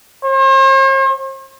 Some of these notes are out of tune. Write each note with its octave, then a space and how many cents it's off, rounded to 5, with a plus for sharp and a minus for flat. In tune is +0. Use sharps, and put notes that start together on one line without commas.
C5 +45